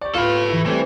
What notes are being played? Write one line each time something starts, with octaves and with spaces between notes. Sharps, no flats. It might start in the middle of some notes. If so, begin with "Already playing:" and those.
G4 D5 C#6
B3 E4 F4 A4 B5
E3 E4 C#7
E3 G3 A3 C4 C#5